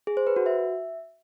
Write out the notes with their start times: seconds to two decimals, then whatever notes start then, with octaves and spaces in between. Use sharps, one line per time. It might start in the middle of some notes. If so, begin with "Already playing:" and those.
0.07 G#4
0.17 C5
0.27 B4
0.36 F#4
0.46 E5